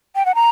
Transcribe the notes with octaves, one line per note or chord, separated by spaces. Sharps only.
G5
F#5
A#5